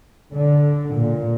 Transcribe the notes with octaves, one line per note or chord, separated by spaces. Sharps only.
D3
A#2